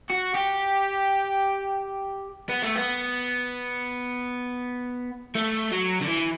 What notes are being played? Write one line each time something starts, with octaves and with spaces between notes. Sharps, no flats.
F#4
G4
B3
A3
B3
A3
F#3
D3
E3